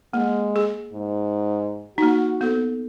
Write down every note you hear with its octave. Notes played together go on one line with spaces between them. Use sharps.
G#3 A#3
G#4
G#2
A#3 D#4 F#4
B3 A4